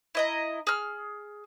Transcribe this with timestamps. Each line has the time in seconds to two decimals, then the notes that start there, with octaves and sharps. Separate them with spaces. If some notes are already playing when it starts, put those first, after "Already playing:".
0.15 E4 D#5 A#5
0.67 G#4 F6